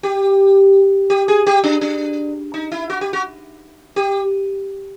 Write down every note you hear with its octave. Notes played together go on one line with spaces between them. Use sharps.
G4
G4
G#4
G4
D4
D4
D#4
E4
F#4
G4
F#4
G4